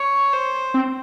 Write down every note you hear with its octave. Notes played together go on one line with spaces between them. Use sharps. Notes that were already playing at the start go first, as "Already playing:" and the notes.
Already playing: C#5
C5
C4